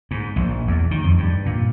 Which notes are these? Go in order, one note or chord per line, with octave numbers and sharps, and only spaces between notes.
G#2
A#1
E2
D#3
F2
G2
A#2